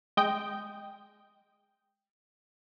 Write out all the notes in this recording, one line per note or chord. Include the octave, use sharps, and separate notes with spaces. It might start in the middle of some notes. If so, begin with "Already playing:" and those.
G#3 D#5 G5